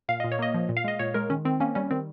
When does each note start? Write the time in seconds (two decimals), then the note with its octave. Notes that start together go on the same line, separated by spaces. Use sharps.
0.09 A#2 F5
0.20 A#2 D#5
0.32 C#5
0.39 A#3 D#5
0.54 F3
0.69 A#2
0.77 F5
0.84 G#3 D#5
0.99 A#2 C#5
1.14 G#3 A#4
1.30 D#3 C#4
1.45 D#3 C4
1.60 A#3 C#4
1.75 G3 C#4
1.91 D#3 C4